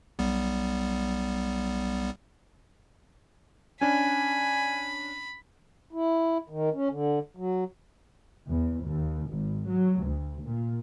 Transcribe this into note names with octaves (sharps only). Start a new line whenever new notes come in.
B1 G3 B3
C#4 D4 G#5 B5
E4
D#3
C#4
D3
F#3
E2
D#2
G#1
F#3
D2
A#2